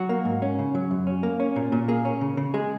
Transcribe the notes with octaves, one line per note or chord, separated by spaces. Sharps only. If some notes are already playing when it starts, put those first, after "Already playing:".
Already playing: F#3 F#4
A#3
G#2
C#4
C#3
F#3
F#2
C#4
A#3
C#4
A#2
A#2
A#3 G#4
C#4
C#3
C#3
G#3 G#4